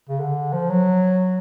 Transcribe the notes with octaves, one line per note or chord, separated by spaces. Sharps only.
C#3
D3
F3
F#3